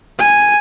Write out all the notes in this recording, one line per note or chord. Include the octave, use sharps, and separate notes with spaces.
G#5